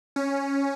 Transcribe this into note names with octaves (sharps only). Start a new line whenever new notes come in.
C#4